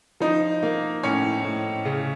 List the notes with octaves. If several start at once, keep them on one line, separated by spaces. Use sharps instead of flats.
F3 D#4
A#3
A2 C#4
A2
C#3